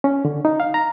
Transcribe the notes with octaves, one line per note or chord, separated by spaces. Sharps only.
C#4
D3
D#4
F5
A#5